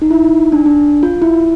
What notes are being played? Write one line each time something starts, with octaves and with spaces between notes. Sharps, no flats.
D#4
E4
D#4
D4
D4
F4
E4